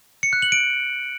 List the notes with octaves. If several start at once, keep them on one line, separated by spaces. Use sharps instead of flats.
C#7
F#6
F#7
D7